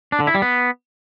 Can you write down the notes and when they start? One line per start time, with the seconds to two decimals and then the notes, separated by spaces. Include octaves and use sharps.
0.12 D4
0.20 D3
0.27 E4
0.35 G3
0.42 B3